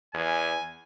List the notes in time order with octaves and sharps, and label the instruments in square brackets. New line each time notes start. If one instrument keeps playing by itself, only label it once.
[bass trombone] E2 [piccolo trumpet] G#5